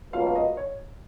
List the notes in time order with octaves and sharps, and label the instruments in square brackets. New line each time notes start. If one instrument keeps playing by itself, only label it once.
[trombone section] C#2 B2 F#3 A#3 F4 [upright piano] F5
[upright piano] F5
D#5
C#5